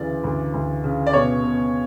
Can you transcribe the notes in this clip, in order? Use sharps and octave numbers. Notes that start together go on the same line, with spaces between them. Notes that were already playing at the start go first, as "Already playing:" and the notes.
Already playing: D2 C#3 E3 D5
D2
D2
C#3
D5
B2 C#5
B2